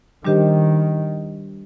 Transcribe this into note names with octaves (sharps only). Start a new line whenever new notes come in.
D#3 G3 D4 G4 C5 D#5